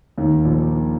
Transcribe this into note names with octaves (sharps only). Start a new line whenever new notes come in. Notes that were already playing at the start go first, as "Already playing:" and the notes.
D#2 D#3
A#1 A#2